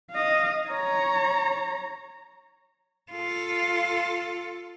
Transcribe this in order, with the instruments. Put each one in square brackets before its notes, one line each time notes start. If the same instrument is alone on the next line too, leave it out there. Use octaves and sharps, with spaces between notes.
[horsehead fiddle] D#5 F5
C#5 A#5
[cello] F4 A4